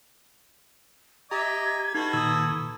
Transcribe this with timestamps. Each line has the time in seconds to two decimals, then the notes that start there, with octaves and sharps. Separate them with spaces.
1.31 G4 D#5 E5 A#5 D6 G#6
1.95 D#4 F#4 A4 B4
2.13 A#2 D#3 D#6 E6